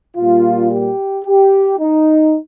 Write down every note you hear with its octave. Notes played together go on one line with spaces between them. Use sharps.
A#2 G3 A#3 F4
G4
G4
D#4